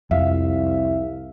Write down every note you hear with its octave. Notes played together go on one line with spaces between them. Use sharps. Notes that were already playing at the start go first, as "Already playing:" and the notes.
C2 F2 E5 F5